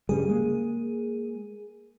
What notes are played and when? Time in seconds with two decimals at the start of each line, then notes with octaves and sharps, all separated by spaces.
0.09 G2 C#3 G3 G#4
0.28 G#3 A#3